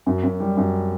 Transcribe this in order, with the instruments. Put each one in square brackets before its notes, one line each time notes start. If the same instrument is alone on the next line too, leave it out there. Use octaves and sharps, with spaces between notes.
[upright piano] F#2
F#2
G3
F#2